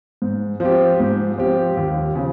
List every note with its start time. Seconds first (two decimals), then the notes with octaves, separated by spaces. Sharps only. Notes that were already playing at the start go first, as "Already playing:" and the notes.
0.22 G#2
0.60 F3 C4 G4
1.00 G#2
1.38 F3 C4 G4
1.77 D#2
2.15 C#3 F3